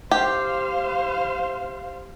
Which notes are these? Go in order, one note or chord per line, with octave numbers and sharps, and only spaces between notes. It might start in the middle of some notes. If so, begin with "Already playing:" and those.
G4 C5 F5